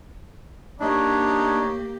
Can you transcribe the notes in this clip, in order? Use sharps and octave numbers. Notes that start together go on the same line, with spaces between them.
A#3 D4 D#4 G4 C#5